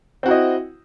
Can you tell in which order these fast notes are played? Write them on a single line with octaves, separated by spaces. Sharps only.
C4 F#4 E4 D#5